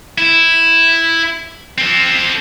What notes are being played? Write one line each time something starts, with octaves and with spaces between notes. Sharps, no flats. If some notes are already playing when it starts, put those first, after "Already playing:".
E4
C4 A4